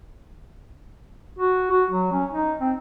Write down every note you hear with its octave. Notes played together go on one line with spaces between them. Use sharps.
F#4
F#4
F#3
C#4
D#4
C4